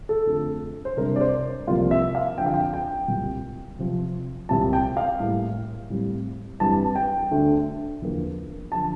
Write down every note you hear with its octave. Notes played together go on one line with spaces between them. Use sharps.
A4
F2 D3 F3 A3
C5
C3 G3 D4 A#4
D5
C5
C2 C3 F3 A#3 F4
E5
F5
F2 D3 F3 G5
F5
G5
G5
C2 A#2 G3
C3 F3 C4
C2 A#2 G3 C4 A5
G5
F5
A2 G3 A#3
A2 G3 C4
G2 E3 G3 C4 A5
G5
D2 D3 A3 D4
E2 D3 F3 A#3
D3 F3 A5